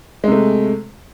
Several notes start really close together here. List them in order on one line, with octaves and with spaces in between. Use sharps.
G#3 C3 A3